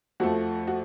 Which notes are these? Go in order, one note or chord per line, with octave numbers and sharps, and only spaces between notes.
F2 F3 A3 F#4
F#4